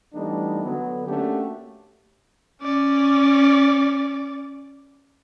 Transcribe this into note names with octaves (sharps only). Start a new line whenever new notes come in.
E3 G3 A3 B3 D4 D#4
D3 F#3 B3
A3 A#3 C#4 D4 F#4 G4
C#4 D5